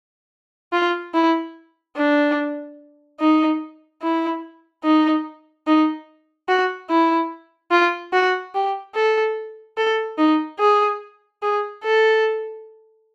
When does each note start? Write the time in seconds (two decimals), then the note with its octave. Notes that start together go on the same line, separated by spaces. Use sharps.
0.73 F4
1.14 E4
1.97 D4
3.20 D#4
4.02 E4
4.84 D#4
5.67 D#4
6.49 F#4
6.89 E4
7.71 F4
8.13 F#4
8.54 G4
8.95 A4
9.77 A4
10.18 D#4
10.59 G#4
11.42 G#4
11.84 A4